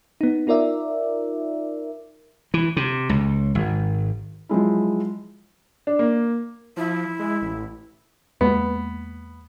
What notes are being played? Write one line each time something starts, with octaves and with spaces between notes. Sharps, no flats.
B3 D#4
D#4 F4 A#4 D5 E5
E3
C3
C#2
G#1
F3 F#3 G#3 E4
D4
A#3
F3 E4
G#3
A1
E2 G#3 A#3 B3